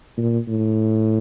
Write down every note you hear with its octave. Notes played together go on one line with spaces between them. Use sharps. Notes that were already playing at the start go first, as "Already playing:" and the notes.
A#2
A2